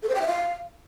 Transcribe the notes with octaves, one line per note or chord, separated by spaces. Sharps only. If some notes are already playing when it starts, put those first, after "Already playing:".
A4
C5
G5
E5
F5